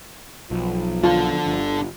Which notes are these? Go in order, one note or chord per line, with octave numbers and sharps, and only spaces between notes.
B1 F3
D4 F4 A4
G1